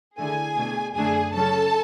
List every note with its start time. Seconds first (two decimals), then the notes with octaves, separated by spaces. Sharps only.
0.18 D3 A3 E4 G#4 G#5
0.56 B2 A3 D4
0.94 F#2 D3 A3 D4 G#4 G#5
1.32 C#3 F#3 C#4 A4 A5